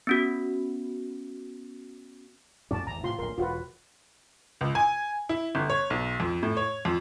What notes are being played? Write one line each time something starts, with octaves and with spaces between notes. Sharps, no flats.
B3 C#4 F#4
F2 A#2 C#4 D5 A5
G#1 E2 A#5
A2 C3 E3 F4 C6
D1 A#1 A#4 C6
E1 F4 F#4 B4
C#2
G#5
E4
G1
C#5
B1
F2
A2
C#5
F2